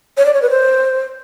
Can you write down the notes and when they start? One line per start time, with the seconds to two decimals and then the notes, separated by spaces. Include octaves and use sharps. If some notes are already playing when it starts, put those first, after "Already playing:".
0.17 C#5
0.26 D5
0.34 C#5
0.42 B4
0.50 C5